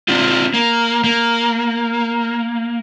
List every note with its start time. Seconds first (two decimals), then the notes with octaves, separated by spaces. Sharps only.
0.08 C4 D4 F4
0.54 A#3
1.04 A#3